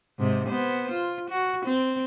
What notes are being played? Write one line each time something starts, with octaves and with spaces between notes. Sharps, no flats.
G#2 C3
B3 C5
F4
F#4
C4